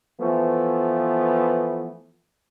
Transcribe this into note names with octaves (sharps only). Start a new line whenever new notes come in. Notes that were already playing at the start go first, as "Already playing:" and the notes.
E3 F3 A3 B3